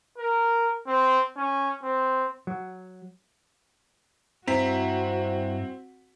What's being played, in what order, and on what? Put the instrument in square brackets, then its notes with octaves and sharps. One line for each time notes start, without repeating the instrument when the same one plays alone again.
[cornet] A#4
C4
C#4
C4
[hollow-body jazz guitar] F#3
[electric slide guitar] G2 E4 A#5 [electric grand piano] C4 B6 [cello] F#4